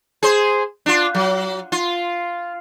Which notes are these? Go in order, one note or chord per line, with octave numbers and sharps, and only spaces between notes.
G#4 C5
D4 F4
F#3
F4